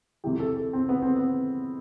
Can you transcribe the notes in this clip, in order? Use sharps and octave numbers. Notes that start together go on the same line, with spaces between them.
F2 C3 E3 G4
A4
A4
C4
B3
C4
B3